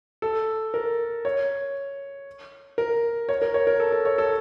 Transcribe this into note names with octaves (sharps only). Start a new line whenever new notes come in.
A4
A#4
C#5
A#4
C#5
A#4
C#5
A#4
A4
A4
C#5
A4